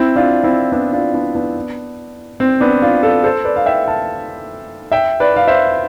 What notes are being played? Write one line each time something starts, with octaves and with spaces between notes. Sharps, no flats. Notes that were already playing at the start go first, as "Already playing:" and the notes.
Already playing: C4 E4
D4 F4
C4 E4
B3 D4
D4 F4
B3 D4
B3 D4
C4
B3 D4
D4 F4
F4 A4
A4 C5
B4 D5
F5
E5 G5
F5 A5
E5 G5
B4 D5
F5
C5 E5